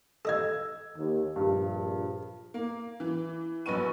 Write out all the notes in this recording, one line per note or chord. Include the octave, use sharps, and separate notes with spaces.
A4 D#5 F5 E6 G#6
D#2
A#1 G2
A#3
E3
A#1 F#3 B4 C#6 D#7